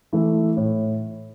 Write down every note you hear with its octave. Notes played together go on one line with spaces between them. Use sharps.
E3 A3 E4
A2